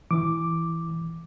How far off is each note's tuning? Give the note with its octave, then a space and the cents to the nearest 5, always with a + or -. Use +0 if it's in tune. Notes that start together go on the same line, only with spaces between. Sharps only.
E3 +0 D6 +0